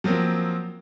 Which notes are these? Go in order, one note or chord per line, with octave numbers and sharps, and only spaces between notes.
F3 F#3 A#3 C4